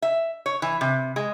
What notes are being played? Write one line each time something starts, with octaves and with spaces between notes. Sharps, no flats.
E5
C#5
E3
C3
G#3